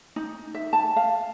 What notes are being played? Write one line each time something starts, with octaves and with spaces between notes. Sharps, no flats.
D#4
E5
A5
F5